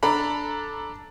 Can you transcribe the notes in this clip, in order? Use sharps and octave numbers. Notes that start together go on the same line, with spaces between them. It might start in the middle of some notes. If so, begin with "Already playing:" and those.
D4 A4 A#5 B5